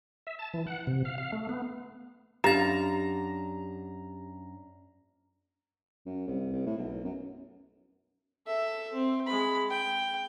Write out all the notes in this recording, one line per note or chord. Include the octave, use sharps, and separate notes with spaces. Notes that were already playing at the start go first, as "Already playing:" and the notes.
E5
A5
E3
F#5
C3
F5
F5
A3
B3
F#2 D4 G4 F5 A#5 A6
F#2
C2
C2
A2
B1
F#2
A4 E5
C4
G#3 B5
G5